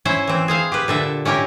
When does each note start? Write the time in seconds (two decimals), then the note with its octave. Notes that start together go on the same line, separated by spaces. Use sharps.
0.05 C#4 E4 C5
0.27 E3 C4
0.48 G#4 C5 F5
0.72 G4 B4
0.88 A#2 D3 E5
1.25 C#4 E4 G4 A#4